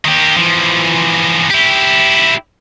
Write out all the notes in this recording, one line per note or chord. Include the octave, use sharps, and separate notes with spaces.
D#3 G4
E3 F3
E4 G4